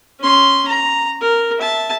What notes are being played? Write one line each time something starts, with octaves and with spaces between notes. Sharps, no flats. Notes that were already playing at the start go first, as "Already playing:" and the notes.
C#4 C6
A#5
A#4
E5 A5